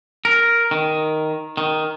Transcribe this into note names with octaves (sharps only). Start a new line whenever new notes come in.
A#4
D#3
D#3